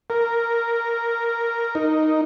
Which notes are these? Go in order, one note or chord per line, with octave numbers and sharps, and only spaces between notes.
A#4
D#4